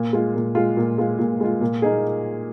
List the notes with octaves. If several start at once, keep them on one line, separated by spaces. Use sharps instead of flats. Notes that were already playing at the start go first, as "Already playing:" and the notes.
Already playing: A#2
G#3 F4
A#2
G#3 F4
A#2
G#3 F4
A#2
G#3 F4
A#2
A#3 D#4 G#4